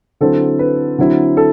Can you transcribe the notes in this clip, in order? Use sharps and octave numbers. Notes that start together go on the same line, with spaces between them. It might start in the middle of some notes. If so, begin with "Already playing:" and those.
D3 F#3 C4 E4 A4
B4
D3 F#3 C4 E4
A4